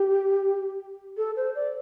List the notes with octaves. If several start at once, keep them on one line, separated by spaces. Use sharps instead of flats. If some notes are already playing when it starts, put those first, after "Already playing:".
Already playing: G4
A4
C5
D5